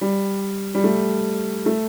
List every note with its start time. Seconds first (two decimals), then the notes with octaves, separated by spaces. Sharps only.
0.01 G3
0.75 G3
0.84 A3
1.66 A3